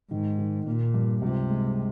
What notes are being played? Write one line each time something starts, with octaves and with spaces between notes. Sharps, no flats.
G#2 D#3
D#3
A#2 A#3
G2
C#2 C3
G#3